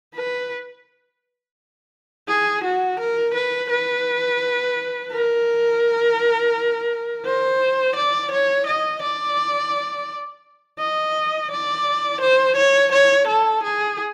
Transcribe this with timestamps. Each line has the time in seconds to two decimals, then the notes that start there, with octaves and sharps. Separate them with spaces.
0.15 B4
2.28 G#4
2.64 F#4
3.00 A#4
3.34 B4
3.70 B4
5.12 A#4
7.25 C5
7.96 D5
8.31 C#5
8.67 D#5
9.02 D5
10.79 D#5
11.51 D5
12.21 C5
12.56 C#5
12.92 C#5
13.28 A4
13.63 G#4